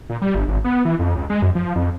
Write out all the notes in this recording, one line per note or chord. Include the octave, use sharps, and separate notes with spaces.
A#2
G3
G1
G#1
B3
E3
F2
C#2
G#3
F#2
F3
F2